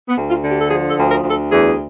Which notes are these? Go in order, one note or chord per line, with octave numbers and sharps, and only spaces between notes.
B3
D2
F4
D3
G4
A4
F3 G#4
A4
D2
A#4
D2
A4
E2 G#4